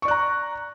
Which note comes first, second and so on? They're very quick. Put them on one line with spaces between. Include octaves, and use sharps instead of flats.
C#6 D5 F#6 A#5